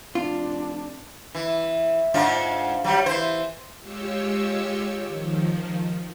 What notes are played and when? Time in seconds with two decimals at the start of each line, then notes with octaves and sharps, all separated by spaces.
0.15 F1 D4 F4
1.35 E3
2.14 G#2 D4 F4
2.84 F#3 G3
3.06 E3 C5
3.80 G#3 F4 G4 C#5 E6 C#7
5.04 D#3 F3